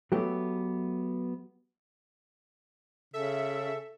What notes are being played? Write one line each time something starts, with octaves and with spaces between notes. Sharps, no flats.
F#3 A3 B3 G4
C#3 A4 E5